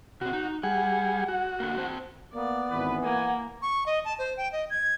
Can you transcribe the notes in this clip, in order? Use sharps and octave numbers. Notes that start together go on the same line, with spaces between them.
B2 C4 F#4
D#4
G3 G#4 F#5
F#4
D3 A#3
C4 C5 A5
A#3 B3 D5
G#1 E3 B4
A#3 F#5 G#5
C#6
D#5
A5
C5
G5
D#5
G#6